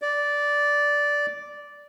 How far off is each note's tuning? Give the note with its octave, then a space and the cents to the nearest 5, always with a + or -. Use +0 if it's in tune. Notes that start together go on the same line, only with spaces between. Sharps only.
D5 -10